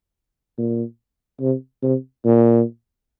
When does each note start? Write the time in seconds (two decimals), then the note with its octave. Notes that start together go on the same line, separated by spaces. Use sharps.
0.58 A#2
1.40 C3
1.82 C3
2.24 A#2